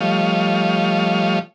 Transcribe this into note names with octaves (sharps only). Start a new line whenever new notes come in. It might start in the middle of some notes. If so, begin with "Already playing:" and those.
F3 G3 A3 C#5 D#5 F5